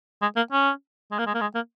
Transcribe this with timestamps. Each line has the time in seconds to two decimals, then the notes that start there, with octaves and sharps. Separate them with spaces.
0.22 G#3
0.37 A#3
0.52 C#4
1.11 G#3
1.19 A#3
1.26 G#3
1.34 A#3
1.41 G#3
1.55 A#3